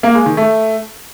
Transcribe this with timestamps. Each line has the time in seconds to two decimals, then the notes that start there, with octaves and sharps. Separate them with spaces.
0.03 A#3
0.15 G#3
0.26 D#3
0.37 A3